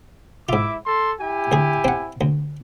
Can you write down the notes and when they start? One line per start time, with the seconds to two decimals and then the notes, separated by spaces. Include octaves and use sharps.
0.49 G#2 E4 F4 E5 D6
0.85 A4 C6
1.20 E4 G4 G#5
1.52 D2 G#4
1.84 C4 F#5
2.21 D2